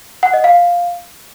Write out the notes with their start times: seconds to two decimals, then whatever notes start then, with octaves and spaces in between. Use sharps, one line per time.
0.23 F#5
0.33 D#5
0.44 F5